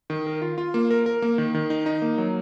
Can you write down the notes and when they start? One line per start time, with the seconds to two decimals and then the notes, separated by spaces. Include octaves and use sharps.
0.10 D#3
0.27 A#4
0.42 F4
0.58 F4
0.74 A#3
0.91 A#4
1.06 A#4
1.22 A#3
1.38 D#3
1.54 D#3
1.70 D#4
1.86 D#4
2.02 A#3
2.18 F#3